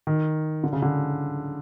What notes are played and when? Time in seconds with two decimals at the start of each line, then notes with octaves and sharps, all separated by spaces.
0.07 D#3
0.64 D3
0.73 C#3
0.82 D3